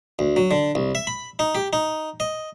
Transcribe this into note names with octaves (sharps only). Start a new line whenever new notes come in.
D2
F#3
D3
C2
E5
B5
D#4
G4
D#4
D#5